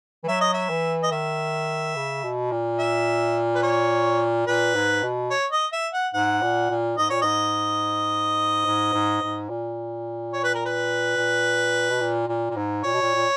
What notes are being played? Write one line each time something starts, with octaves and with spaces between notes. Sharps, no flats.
E3
F#3 E5
D#5
E5
E3
D#5
D#3 E5
C#3
B2
A#2
E5
B4
C#5
A#2 B4
G#2
B2
C#5
D#5
E5
F#5
G#2 F#5
A#2
A#2
G#2 D#5
A#2 C#5
G#2 D#5
G#2
G#2
G#2
A#2
C#5
B4
A#4
B4
A#2
B2
A#2
A#2
A#2
G#2
A#2 C#5
B2
A#2
A#2